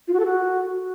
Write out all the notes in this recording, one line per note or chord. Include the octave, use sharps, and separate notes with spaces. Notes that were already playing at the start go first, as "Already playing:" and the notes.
F4
F#4
A4
F#4